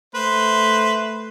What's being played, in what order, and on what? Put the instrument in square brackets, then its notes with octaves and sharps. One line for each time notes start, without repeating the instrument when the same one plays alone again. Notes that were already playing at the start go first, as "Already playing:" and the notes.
[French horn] A3 [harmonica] B4 C5